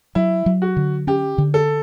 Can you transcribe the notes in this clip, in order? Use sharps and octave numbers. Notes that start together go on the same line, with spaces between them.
F#3 E4
F#3
F#4
D3
C#4 G4
D3
A4